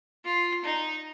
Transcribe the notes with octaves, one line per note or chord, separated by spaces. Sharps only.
F4
D#4